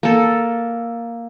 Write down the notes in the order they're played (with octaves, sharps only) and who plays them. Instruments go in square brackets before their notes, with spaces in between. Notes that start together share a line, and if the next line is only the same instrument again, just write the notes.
[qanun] A#3 A4